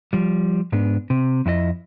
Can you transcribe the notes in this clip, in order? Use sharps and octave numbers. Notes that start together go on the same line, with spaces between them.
F3 G3
G#2 B3 D4
C3
F2 E4 F#4 D#5